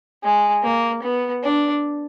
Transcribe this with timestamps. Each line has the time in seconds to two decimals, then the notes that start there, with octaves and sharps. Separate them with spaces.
0.23 G#3
0.63 A#3
1.02 B3
1.43 D4